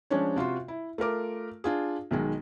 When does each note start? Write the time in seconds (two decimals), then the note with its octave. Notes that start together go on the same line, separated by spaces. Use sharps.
0.10 F3 G#3 C#4 D4 C#5
0.36 C3 F4 F#4 C6
0.68 E4
0.98 A3 F4 A#4 D6
1.64 D4 F4 G#4
2.11 B1 D#3 G#3